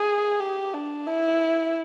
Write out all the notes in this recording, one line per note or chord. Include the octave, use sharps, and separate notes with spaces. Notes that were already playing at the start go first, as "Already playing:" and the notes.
Already playing: G#4
G4
D4
E4